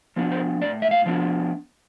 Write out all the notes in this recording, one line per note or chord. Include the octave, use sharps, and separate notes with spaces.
F3 B3 D4
C5
A2 D5
E5
F5
F3 B3 D4